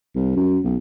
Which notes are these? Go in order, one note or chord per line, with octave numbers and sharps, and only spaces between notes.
C2
F#2
B1